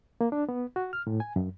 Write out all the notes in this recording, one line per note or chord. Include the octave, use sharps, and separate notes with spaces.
A#3
D4
B3
F#4
F6
A2
G#5
F#2